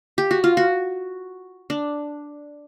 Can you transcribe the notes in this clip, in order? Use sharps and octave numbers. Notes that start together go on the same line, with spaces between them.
G4
F#4
F4
F#4
D4